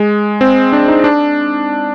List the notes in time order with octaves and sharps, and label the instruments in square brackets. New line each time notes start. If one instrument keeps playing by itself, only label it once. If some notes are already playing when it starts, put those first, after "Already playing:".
Already playing: [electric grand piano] G#3
C4
D4
D#4
D4